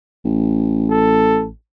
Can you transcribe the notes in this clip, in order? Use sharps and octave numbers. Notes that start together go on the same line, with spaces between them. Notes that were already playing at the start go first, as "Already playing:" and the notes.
A1
A4